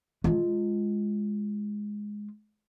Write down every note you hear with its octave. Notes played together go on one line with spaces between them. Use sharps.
G#3 F4